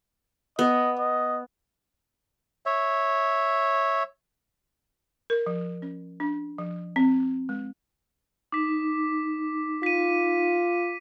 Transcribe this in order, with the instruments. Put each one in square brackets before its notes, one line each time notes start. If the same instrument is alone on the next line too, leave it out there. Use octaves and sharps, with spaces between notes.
[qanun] B3 [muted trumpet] D#5
[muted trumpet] D#5
[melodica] C#5 E5
[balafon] A#4
F3
C#4
D4
F3
C4
G#3
[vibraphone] D#4 [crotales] D6 B6
[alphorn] F4 [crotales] B6 D#7